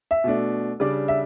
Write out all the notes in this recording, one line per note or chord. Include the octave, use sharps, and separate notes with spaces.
E5
B2 A3 D4
C#3 G3 D4 D5
E5